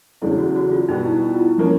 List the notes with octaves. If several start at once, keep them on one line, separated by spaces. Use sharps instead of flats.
E2 C#3 F#3 A3 D4 E4
F#4
F#4
F4
B2 G3 B3 D#4
E4
D#4
F4
E4
F3 A#3 C#4